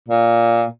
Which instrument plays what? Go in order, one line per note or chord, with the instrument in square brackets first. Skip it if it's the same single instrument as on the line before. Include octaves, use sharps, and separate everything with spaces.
[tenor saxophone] A#2